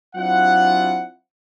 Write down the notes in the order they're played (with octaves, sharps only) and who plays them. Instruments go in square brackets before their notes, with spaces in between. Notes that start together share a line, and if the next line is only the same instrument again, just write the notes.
[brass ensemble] F#3 C4 D4 E4 F4 F#5